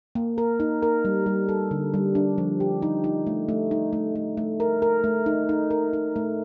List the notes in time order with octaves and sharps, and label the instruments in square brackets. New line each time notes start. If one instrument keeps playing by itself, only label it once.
[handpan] A#3
A#4
D#4
A#4
G3
G3
A4
D3
G3
D4
F3
G4
D#4
D#4
A3
A3
D#4
A3
A3
A3
A#4
A#4
A3
D#4
D#4
A#4
D#4
A3